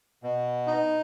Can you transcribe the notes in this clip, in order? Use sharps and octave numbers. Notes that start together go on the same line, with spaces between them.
B2
D#4